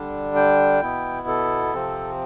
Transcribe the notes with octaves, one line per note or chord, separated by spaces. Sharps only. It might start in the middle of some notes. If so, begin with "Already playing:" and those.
Already playing: D3 G3 D4
G5
B2 B3 E4
A4
C3 F3 C4